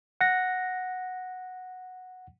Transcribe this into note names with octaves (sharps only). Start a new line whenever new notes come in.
F#5 A#6